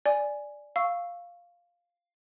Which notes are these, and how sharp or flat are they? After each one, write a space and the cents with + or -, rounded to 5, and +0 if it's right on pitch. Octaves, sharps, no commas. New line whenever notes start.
D5 +0 G#5 +0
F5 +0 C#6 +0 E6 +0